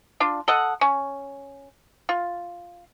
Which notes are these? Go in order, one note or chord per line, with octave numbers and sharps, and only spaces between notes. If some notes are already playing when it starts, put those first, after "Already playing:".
D4 F4
A4 D#5 F#5
C#4
F4